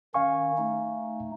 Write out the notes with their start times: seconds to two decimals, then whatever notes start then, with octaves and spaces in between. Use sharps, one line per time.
0.14 D#3 C#4 F5 G#5 C#6
0.58 A3 D#4